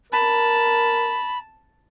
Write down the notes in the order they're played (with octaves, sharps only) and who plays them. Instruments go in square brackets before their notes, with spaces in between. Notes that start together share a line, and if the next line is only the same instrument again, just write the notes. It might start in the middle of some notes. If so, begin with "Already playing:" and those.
[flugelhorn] A#4 [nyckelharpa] A5 [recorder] B5